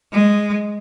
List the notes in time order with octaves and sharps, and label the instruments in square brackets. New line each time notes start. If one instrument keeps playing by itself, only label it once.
[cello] G#3